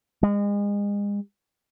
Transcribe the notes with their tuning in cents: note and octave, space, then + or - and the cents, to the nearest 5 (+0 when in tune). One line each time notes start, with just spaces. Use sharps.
G#3 -35